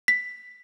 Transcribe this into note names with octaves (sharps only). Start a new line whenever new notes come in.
B6